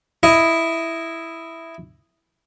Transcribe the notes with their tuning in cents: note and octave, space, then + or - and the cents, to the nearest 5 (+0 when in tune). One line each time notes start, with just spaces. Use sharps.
E4 +0 D#5 +0